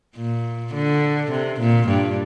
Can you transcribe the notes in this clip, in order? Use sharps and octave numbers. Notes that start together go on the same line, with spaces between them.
A#2
D3
C3
A#2
G2